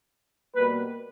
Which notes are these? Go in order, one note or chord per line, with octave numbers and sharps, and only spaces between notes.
B2 G3 A#3 B4